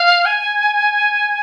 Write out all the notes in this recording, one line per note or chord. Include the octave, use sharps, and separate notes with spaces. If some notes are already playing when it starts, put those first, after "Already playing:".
Already playing: F5
G#5